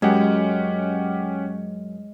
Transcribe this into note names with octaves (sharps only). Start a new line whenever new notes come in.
F#2 G#3 C#4 G4 F#5